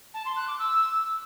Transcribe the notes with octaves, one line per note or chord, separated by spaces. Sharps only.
A5
C6
F#6
D6
E6